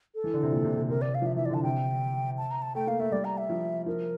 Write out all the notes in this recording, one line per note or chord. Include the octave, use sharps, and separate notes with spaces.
A4
E3
D3
C3
A#2
C3
C3
C3 A#4
D5
F5
F3 E5
E3 E5
D5
D3 A5
C3 G5
A5
A#5
A5
A3 G5
A#3 F5
A3 E5
G3 D5
A#5
E5
F3
F3 A#4